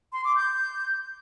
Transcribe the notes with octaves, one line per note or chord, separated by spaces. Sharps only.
C6
D6
G6